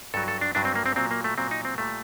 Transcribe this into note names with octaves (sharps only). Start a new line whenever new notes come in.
G2 F#3 A4
A4
D4
G2 F#3 D4
C4
A#3
C4
A#2 F#3 C4
A#3
A3
A#2 F#3 C4
D#4
C4
A#2 G3 A3